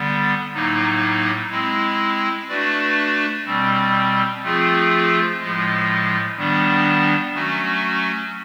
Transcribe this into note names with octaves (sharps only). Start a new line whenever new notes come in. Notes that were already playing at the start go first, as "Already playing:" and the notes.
Already playing: D3 G3 B3
A2 F#3 A#3 D#4
G#3 C4 E4
A3 D4 F#4 B4 D5
B2 G3 C4
F3 A3 C4 F4 G#4
A2 F3 G#3
D#3 G3 B3 D4
F#3 A3 C#4 F#4